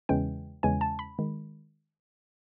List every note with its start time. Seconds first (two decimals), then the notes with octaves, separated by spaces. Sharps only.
0.09 E2 C#3 E3 G#3 C#4 G5
0.63 E2 C#3 E3 G#3 C#4 G#5
0.81 A5
0.99 B5
1.19 D#3 G#3